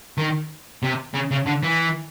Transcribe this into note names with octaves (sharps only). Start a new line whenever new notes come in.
D#3
C3
C#3
C#3
D3
E3